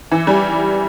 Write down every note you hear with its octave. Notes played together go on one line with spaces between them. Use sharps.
E3
G3